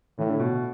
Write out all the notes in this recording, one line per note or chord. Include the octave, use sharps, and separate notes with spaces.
A2 E3
D3
B2